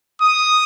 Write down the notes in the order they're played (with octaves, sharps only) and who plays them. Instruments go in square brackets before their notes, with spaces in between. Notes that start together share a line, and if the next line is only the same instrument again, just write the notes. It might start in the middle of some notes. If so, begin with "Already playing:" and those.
[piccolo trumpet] D#6